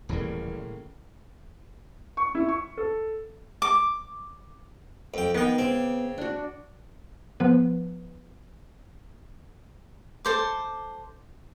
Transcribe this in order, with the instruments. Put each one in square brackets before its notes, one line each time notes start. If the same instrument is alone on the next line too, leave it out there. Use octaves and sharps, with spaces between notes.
[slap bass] D#1 E3 G3 [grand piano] A2 C#3 A#3
[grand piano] C#6
E4
C#6
A4
[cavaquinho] D6
[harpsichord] F2 G5
[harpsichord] D#3 G5 [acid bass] B3 [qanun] D#5
[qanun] C#3 D6 [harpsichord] C4
[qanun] D4 F#4
[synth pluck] F3 B3 B4
[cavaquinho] A4 C5 D6